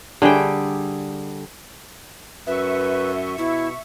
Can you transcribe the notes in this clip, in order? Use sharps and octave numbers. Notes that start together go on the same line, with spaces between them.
D3 G3 G#4 G5
F#2 B4 E5 C#6
B2 E4